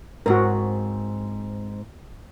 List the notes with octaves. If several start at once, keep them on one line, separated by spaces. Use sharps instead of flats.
G#2 C4 F#4 A#4